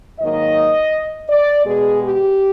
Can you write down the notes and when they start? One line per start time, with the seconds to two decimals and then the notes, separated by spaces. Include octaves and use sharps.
0.20 G#2 D#3 F#3 A#3 D#5
1.29 D5
1.66 B2 G#3 G#4
2.02 G4